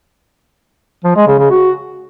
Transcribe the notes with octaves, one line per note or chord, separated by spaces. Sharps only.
F3
G#3
C#3
C#3
F#4